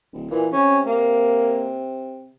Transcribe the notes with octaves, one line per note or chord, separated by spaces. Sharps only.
D1
A#2 E3
C3 C#4
A#3